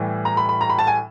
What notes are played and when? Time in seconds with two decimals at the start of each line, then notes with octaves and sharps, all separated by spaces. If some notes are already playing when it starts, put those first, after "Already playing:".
Already playing: A2 E3 G3
0.25 A#5
0.37 B5
0.49 B5
0.61 A#5
0.70 B5
0.79 A5
0.87 G#5